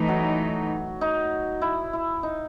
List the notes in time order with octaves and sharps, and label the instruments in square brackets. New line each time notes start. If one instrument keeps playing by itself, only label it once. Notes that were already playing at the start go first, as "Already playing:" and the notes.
Already playing: [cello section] E3 A3 D#4
[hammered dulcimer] F#3
D#4
E4
E4
D#4